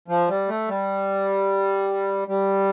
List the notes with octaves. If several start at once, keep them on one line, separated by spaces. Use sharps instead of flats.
F3
G3
A3
G3
G3